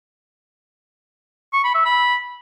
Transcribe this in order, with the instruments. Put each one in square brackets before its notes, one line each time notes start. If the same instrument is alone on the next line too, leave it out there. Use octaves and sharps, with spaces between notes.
[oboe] C#6
B5
E5
B5